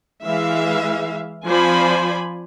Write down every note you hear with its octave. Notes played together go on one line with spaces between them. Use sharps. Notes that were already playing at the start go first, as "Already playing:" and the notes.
E3 G#3 E5 F5
F3 C4 C5 D5 G#5 B5